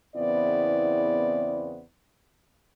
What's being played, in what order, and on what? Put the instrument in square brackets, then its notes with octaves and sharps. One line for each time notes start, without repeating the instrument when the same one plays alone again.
[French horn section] E2 C#3 B3 C4 E4 D5